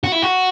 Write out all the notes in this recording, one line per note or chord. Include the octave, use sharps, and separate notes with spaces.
F#4
E4
F#4